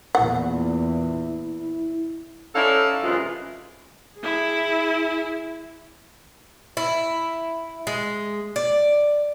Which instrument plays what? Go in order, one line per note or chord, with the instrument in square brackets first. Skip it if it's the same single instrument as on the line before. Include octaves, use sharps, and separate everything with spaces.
[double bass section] E2 A#2 [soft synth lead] E4 [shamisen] F#5
[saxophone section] C#4 D#4 E4 A4 D5 F5
F#2 C3 E3 G#3 F4
[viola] E4 G#4
[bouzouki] E4
G#3
D5